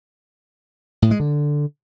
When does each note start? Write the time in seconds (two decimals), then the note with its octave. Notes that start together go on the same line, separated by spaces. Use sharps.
1.02 A2
1.11 G#3
1.20 D3